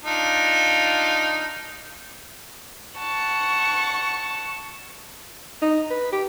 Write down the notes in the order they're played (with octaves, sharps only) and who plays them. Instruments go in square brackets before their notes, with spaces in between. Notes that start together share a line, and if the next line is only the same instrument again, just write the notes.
[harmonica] D4 D#4 F4
[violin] F#5 A5 [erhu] C#6
[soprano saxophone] D#4
B4
G4